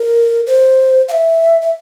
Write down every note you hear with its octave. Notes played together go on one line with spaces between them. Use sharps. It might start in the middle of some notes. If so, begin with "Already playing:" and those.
Already playing: A#4
C5
F5
E5
E5